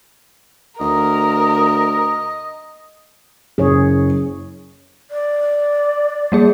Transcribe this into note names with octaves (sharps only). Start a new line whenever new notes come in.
D2 A#4 D#5
F#1 G#4 C#5
D5
G3 A#3 G#4